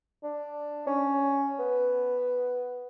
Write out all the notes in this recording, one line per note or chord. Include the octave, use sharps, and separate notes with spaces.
D4
C#4
B3